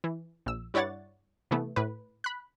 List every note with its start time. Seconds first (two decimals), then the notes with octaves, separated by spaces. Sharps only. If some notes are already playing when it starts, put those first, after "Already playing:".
0.04 E3
0.46 A#1 E6
0.74 G2 E4 C#5 D5 F#5 A6
1.51 C3 E3 A3 B3
1.76 A2 B4
2.24 B5 F#6